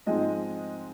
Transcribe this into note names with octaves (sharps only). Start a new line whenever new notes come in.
G#2 F3 G#3 C4 D#5